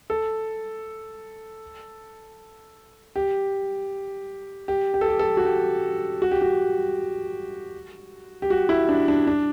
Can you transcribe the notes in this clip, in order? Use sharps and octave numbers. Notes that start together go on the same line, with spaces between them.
A4
G4
G4
G4
A4
G4
A4
F#4
G4
F#4
G4
F#4
G4
F#4
E4
D4
D4
D4